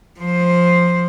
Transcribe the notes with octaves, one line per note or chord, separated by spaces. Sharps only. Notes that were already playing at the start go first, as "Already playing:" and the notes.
F3 C5